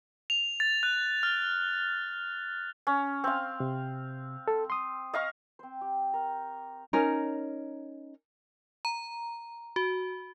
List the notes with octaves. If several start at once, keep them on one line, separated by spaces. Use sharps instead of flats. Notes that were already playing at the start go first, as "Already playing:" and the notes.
F7
A6
F#6
F6
C#4
C4 F5
C3
A4
C6 D#6
D#5 F5 C#6
C4 C5
G4
A#4
C#4 D#4 A#4
A#5
F#4